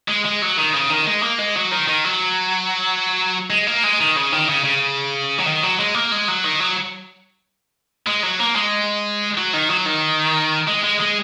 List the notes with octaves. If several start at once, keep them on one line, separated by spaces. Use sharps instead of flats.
G#3
G#3
F#3
D#3
C#3
D#3
G#3
A#3
G#3
F#3
D#3
D#3
F#3
G#3
A#3
G#3
D#3
C#3
D#3
C#3
C#3
F#3
D#3
F#3
G#3
A#3
G#3
F#3
D#3
F#3
G#3
F#3
A#3
G#3
F#3
D#3
F#3
D#3
G#3
G#3
G#3